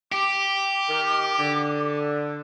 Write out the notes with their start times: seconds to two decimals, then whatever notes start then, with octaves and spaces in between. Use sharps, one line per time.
0.12 G4 D6
0.89 D#3 A#4
1.38 D3